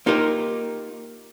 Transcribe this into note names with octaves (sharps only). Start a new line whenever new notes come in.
A#3 D#4 F4 G4 A#4